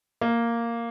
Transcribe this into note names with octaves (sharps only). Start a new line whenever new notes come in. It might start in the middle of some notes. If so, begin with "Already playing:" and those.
A#3